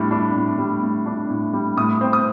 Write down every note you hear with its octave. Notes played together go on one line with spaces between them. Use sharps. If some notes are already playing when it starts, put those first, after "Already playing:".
Already playing: A2 G3 D4
D4
A2
G3
A2
D4
A2
G3
A2 D#6
C4
D#6